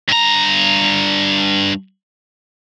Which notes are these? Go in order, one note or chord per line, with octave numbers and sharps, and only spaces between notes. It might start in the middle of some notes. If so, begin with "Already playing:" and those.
G2 A#5